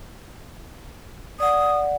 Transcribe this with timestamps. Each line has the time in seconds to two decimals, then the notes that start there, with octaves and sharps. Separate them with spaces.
1.40 D5 F#5 D#6